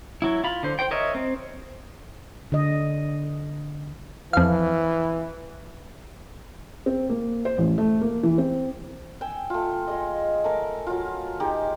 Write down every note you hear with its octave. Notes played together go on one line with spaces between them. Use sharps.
F#3 E4
F4 B5
D3 C5
C5 G5
A#4 C#5 D#5 E5
C4
D3 D#5
F2 E3 F5
C4
A#3
C5
A1
A3
A#3
E3
C4
G5 G#5 E6
A3 F4
G#3 G#4 D#5
A3 A#4 G#5 D6
F#3 F4
G#3 D#4 G4 G#4